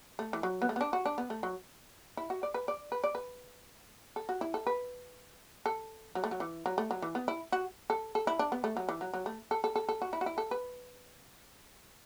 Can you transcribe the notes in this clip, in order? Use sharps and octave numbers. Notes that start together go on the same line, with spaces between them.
A3
E3
F#3
B3
A3
B3
D4
F#4
D4
B3
A3
F#3
E4
F#4
D5
B4
D5
B4
D5
B4
A4
F#4
E4
A4
B4
A4
F#3
A3
F#3
E3
F#3
A3
F#3
E3
B3
E4
F#4
A4
A4
E4
D4
B3
A3
F#3
E3
F#3
F#3
A3
A4
A4
A4
A4
F#4
E4
F#4
E4
A4
B4